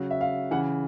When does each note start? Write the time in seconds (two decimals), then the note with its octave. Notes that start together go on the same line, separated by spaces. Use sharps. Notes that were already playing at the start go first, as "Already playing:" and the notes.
Already playing: C#3 F#3
0.11 E5
0.21 F5
0.51 C#3 E3 F#5